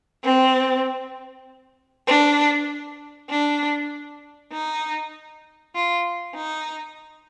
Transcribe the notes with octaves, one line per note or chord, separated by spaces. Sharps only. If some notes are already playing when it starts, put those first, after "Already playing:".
C4
D4
D4
D#4
F4
D#4